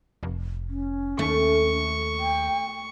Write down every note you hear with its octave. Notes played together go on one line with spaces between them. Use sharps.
F1
C#4
D#2 A3 C#6
G5